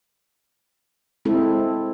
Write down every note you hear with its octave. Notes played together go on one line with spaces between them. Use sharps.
G#3 C4 E4 A4